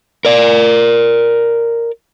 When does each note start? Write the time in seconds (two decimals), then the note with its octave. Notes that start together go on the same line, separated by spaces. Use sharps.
0.25 A#4 D5